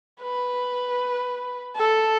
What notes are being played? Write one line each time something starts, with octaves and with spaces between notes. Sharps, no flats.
B4
A4